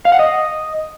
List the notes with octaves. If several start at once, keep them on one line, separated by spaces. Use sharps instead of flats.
F5
F#5
D#5